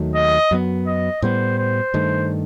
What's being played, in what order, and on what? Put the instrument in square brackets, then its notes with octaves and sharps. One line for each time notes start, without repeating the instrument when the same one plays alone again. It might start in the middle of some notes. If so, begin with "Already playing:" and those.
Already playing: [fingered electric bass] D#2 D#3 F#3 A3
[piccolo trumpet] D#5
[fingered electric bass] F#2 F#3 B3
[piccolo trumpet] D#5
[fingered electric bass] A2 G3 B3 [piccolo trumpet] C5
[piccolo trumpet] C5
[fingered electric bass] G2 D#3 A3